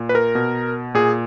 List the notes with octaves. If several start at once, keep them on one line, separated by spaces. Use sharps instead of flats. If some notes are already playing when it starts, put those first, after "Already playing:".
Already playing: A#2
B4
A#4
B2
A#2 G#4